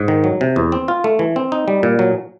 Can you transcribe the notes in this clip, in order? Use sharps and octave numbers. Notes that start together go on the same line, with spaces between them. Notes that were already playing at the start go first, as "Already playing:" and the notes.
Already playing: G#2
D#3
F#3
C3
E2
C4
F4
A3
E3
C4
D#4
G3
A#2
F#3